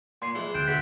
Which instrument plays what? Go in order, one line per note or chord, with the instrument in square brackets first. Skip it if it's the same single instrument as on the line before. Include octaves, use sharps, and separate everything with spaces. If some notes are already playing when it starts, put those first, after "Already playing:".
[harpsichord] A#2 G#5 [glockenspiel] C6 C7
[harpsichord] E3 F3 G#3
[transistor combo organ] D2 G5 [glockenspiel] F#6 D7 E7
[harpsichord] B2 G#4 E5 [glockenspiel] B6